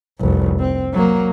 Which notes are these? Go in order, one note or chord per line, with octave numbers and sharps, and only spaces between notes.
F1 C2
C4
F#3 A#3